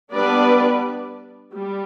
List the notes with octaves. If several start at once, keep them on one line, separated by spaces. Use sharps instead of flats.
G3 B3 D4 B4 D5
G3